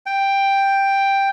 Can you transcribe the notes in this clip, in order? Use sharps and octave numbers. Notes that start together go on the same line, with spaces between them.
G5